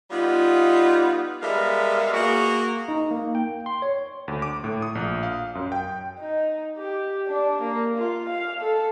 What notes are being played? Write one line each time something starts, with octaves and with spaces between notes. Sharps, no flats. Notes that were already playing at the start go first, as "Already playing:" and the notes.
G3 B3 D#4 F4
G3 G#3 B3 A#4 E5 F5
A#3 F#4 G#4
D#4
A#3
G5
C6
C#5
D2
D6
A2
D#6
A#1
F5
F#2
G5
D#4
G4
D4
A#3
F4
F5
A4